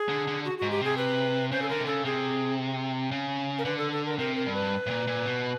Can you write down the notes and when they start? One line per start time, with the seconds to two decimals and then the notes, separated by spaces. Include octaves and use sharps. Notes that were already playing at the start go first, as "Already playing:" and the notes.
Already playing: G#4
0.09 D3
0.27 D3
0.45 F#4
0.58 G#2 F#4
0.71 G4
0.81 C3 G#4
0.98 B4
1.52 C#3 C5
1.62 A4
1.69 D3 A#4
1.81 C3
1.87 C#3 A4
2.05 C3 G#4
3.11 C#3
3.59 A#4
3.65 D3 B4
3.78 A4
3.92 A4
4.06 A#4
4.19 C3 A#4
4.36 A#4
4.46 G2
4.54 B4
4.87 A2
4.90 A#2
5.07 A#2
5.26 B2